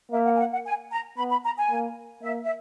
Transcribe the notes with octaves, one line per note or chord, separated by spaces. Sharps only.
A#3 E5
F#5
G#5
F#5
F#5
G#5
A#5
B3 B5
B5
A#5
G#5
A#3
A#3 E5
E5